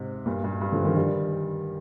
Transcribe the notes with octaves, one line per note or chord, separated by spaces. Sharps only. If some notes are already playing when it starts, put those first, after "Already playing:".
Already playing: G#2 C3
G2 A#2
G2
G2
D3 F3
D#3 G3
D#3 G3